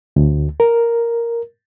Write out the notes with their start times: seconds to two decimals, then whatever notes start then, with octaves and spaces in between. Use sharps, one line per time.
0.16 D2
0.60 A#4